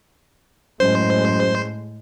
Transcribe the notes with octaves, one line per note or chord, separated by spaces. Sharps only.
F#2 A2 G#3 C5